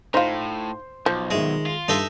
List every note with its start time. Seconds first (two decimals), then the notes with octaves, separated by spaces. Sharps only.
0.14 A2 D#4 F4 C5 C6
1.06 B1 F3
1.31 D#3 G#3 E5
1.66 F4
1.88 G2 D#4 A4 E5